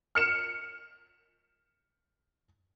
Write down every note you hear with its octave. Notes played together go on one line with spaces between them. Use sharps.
F6 C#7 E7